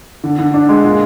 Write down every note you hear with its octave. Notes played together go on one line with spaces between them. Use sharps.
D3
D3
D4
G#3
A#2